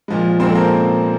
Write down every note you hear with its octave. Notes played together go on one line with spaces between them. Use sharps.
A#2 F3 G#3
A#2 F3 G#3 C4 C5
A4
A#3 A#4